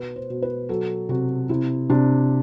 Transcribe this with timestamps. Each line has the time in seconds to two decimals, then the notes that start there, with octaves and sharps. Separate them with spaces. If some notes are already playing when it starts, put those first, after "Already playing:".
Already playing: B2 B4
0.16 C5
0.30 B2
0.42 B4
0.69 F#3 A4
1.09 C3 F#4
1.49 C3 E4
1.90 C3 D4